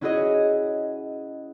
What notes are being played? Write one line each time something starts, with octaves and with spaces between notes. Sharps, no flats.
C#4 E4 F#4 G#4 C#5 D#5